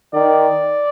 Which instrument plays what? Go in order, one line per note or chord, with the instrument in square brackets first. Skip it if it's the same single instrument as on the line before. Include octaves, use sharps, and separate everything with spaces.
[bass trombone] D#3 [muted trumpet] D5